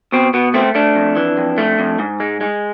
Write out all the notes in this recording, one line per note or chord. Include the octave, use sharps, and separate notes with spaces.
B2 C4
B2 B3
A3 C4
A3 D4
F2
E3
F2
A3
F2
G#2
G#3
G#3